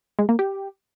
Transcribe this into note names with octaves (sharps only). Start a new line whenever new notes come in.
G#3
A#3
G4